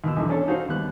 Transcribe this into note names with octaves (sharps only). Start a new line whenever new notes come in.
D#2 B2 E6
B1 E2 D3 E3
C#4 D4 A4 C#5
C#4 D#4 F#4 C5 F5
D#2 G3 B3 F#6